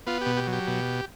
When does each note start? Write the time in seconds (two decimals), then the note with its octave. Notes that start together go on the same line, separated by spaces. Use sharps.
0.07 B3 F4
0.21 B2 G4
0.37 G4
0.47 F#3
0.52 G4
0.68 B2